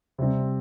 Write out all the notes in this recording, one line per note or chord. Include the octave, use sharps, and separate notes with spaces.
C3 G3 C4